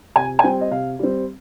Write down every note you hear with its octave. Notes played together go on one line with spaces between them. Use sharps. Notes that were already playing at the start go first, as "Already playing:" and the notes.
C3 G#5
G#5
G3 C4 G5
D#5
C3 F5
G3 C4